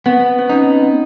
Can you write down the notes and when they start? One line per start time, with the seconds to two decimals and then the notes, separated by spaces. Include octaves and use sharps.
0.06 B3 C4
0.39 C4
0.49 C#4 D#4